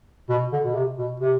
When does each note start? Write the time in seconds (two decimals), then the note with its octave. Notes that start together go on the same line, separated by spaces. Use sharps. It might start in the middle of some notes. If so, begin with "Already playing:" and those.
0.29 B2
0.52 D3
0.64 B2
0.74 C3
0.98 B2
1.20 C3